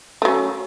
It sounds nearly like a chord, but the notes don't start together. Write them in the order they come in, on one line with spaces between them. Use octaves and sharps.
A3 F#3 C#4